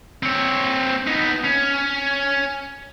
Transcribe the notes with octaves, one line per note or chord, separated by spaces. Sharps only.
C4 C#5
B3 D#4
C#4